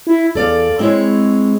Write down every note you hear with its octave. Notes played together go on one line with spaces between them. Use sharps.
E4
E2 A4 D5 F5
G#3 C4 E4 C#5